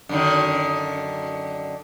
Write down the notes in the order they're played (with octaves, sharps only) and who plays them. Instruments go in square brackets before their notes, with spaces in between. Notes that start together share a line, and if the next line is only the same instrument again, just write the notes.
[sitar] F#2 D3 D#3